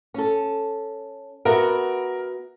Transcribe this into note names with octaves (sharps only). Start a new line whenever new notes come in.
C#4 A4
B3 F#4 A#4 E5